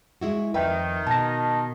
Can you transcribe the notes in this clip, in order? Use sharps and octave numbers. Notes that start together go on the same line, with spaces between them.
G#3 E4 F#4
F2 D#3 B4 E5 G5
B2 A5 A#6